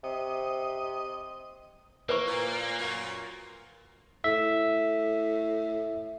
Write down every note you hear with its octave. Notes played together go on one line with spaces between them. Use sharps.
C3 D#5
A#3 B4 C5 C#6
A#2
F#2 A#2
A2 E5